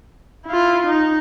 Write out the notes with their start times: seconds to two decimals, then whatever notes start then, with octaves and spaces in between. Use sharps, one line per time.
0.46 E4 F4
0.86 D#4